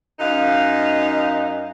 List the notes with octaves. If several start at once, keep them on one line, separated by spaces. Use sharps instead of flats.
F#2 D#4 D#5 F5